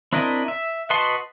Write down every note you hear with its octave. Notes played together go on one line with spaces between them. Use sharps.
C4 D4 E4 A#4 D#5
E5
F#4 B4 D#5 A5 C6